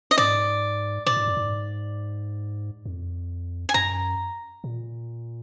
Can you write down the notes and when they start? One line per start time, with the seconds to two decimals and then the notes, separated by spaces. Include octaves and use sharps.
0.11 D#5
0.18 G#2 D5
1.06 A#2 D5
1.17 G#2
1.27 F#2
1.37 G#2
2.86 F2
3.69 G#5
3.74 F#2 A#5
4.64 A#2